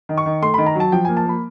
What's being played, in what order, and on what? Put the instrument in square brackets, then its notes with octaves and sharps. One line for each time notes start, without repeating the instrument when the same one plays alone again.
[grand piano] D#3
C#6
D#3
A3 C6
D#3 B5
A#5
F#3 A5
F3 G5
A#3 G#5
A5
A#3 B5